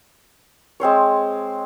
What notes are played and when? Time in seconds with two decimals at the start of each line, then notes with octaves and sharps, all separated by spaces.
0.80 G#3 C4 C5 C#5